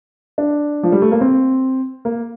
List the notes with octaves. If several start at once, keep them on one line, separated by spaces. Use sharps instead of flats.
D4
F3
G3
A3
A#3
C4
A#3